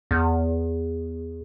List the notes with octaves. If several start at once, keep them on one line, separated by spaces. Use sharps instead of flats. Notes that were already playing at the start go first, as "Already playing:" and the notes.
E2